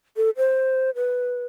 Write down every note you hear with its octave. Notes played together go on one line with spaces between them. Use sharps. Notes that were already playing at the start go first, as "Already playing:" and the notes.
A4
C5
B4